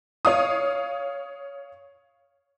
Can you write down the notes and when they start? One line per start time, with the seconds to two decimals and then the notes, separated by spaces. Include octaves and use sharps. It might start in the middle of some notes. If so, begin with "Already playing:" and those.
0.25 C#5 F5 D#6